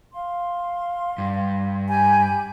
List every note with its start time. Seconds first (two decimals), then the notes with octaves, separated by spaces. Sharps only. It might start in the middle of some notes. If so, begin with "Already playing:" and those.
0.13 F5 C6
1.18 G2
1.89 G4 G#5 B5 G6